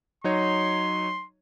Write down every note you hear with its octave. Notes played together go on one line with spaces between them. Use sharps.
F#3 D#4 C#5 C6